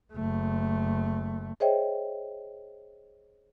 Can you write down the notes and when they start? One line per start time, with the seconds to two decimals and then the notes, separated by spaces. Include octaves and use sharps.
0.13 F#1 A3
1.60 G#4 C5 C#5 D#5 E5 G5